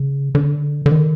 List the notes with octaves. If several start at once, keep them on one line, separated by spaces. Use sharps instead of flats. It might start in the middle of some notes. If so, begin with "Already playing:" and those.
Already playing: C#3
D3
D3
D#3